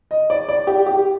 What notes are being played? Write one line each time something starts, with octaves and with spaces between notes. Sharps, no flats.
D#5
D5
D5
G4
G4